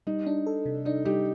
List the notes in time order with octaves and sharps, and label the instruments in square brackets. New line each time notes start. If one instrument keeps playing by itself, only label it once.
[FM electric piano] G3 [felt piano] D#4
[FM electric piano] D4
A4
C3
[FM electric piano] D4 [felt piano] D#4
[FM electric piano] G3 [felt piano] D#4 G4